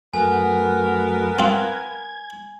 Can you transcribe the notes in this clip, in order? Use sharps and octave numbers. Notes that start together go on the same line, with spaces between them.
F#2 A3 B3 F#4 A#4 G#5
C4 F4 G#6